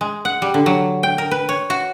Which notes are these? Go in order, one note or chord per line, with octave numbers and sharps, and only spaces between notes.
G#3
F#5
G3
D3
F#3
G5
A#4
B4
C#5
F#4